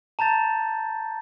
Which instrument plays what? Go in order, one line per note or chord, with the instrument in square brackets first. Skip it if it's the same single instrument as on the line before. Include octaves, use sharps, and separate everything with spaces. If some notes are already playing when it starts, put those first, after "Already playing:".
[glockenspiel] A5 A#5 G6 A6